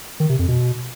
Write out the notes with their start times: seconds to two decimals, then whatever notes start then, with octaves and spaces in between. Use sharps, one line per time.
0.20 D#3
0.29 C3
0.39 F2
0.48 B2